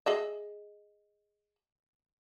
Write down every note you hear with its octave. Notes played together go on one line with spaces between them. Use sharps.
G#4 D#5 E5